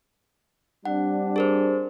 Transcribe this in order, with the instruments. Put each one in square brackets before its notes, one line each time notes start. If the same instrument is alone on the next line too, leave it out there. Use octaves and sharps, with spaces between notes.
[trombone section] G3 C4 D4 [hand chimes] F#5
[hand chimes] G#4 A#4 C5